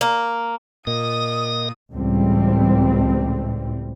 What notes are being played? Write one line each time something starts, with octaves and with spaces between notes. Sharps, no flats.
A#3
A#2 A#4 D#5 D#6
C#2 A2 E3 G3 C4